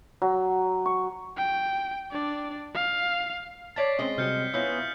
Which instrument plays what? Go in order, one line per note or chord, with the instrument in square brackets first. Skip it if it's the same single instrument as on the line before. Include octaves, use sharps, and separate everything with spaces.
[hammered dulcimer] F#3
C#6
[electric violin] G5
D4 D5
F5
[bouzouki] C#5 D5 A5 [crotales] A6 B6 C7
[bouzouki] G#3 D#5 [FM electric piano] C4 C#4
[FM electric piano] C3 F#3 G3 [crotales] F6 G6 C#7
[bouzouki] B3 C#4 [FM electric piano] E4 F4 D#5 [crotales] E6 G6